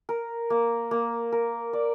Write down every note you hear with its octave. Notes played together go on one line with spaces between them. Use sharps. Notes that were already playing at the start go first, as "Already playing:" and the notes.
A#4
A#3
A#3
A#4
D5